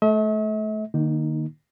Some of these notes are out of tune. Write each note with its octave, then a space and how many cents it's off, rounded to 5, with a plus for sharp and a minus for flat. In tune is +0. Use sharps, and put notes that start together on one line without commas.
A3 -25 E5 -45
D#3 -45 A#3 +0 D#4 +0